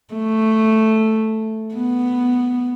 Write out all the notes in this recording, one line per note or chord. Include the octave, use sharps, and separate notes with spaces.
A3
B3